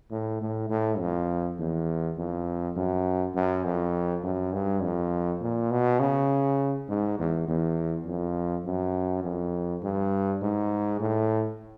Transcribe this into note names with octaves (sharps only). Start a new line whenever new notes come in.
A2
A2
A2
F2
E2
F2
F#2
F#2
F2
F#2
G2
F2
A#2
B2
C#3
G#2
E2
E2
F2
F#2
F2
G2
G#2
A2